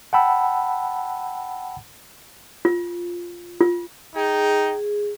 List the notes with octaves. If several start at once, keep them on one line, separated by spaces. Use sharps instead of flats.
F#5 G5 A5 B5 E6
F4
F4
D#4 G#4 G5